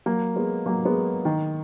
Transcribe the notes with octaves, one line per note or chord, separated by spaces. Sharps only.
F#3 A#3
G#3 B3
F#3 A#3
G#3 B3
D#3